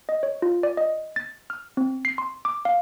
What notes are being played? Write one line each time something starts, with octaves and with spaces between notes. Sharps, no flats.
D#5
C#5
F4
D5
D#5
A6
F6
C4
C7
C6
D6
F5